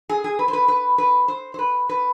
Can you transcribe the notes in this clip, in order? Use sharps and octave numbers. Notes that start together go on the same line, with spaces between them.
G#4
G#4
B4
C5
B4
B4
B4
C5
C5
B4
B4